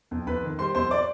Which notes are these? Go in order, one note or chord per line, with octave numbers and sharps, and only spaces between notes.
F2
F2 B4 B5
D#3
G3 C5 C6
F2 C5 C6
D5 D6